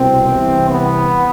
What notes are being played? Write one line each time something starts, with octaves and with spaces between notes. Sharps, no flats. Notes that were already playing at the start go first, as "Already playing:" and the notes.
Already playing: C2 B2 C4
C2 C3 E3
B3